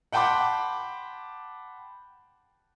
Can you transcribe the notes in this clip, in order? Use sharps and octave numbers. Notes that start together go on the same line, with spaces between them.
F#5 G5 A5 B5 C6 D6